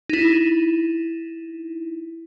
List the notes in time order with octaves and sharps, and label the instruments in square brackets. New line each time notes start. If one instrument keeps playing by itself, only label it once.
[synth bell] D#4 E4